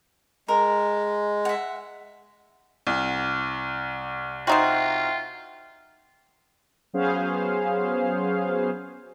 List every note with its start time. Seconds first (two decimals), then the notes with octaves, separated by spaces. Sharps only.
0.48 G#3 A#4
1.45 E5 F#5
2.87 C2
4.47 C4 D#4 F4 F#4 E5 G5 C6
6.93 F#3 B3 C#4 G#4 C5 F5